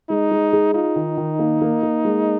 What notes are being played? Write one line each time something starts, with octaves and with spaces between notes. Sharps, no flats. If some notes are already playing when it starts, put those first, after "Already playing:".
G#3 D#4
G#3
G#4
D#4 F4
D#3
D#3
A#3
A#3
A#3
G#3